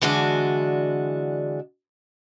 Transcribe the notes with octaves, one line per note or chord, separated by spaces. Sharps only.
D3 E3 G#3 D4 F#4